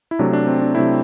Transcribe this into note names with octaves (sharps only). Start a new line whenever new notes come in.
E4
C3 F#3 A3 D4
D4
C4
D4
C3 F#3 A3 C4 E4